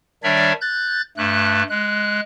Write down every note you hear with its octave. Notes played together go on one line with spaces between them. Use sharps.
D#3 G3 D4 C#5 D5 E5
F#6 G6 A6
G2 A3 F#6
G#3 F#6